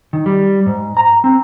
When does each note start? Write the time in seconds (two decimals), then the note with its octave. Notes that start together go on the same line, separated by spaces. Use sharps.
0.13 D#3
0.26 G3
0.66 G#2
0.97 A#5
1.24 C4